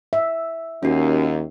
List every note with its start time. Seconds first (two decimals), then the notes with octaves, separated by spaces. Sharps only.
0.13 E5
0.83 D#2 C#4 F#4